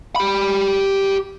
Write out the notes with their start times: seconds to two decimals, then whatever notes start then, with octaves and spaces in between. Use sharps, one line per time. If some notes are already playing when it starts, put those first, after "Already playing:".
0.16 G4 B5